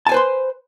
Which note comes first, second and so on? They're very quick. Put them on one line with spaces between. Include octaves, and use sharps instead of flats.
A5 G#5 C5 B4 C6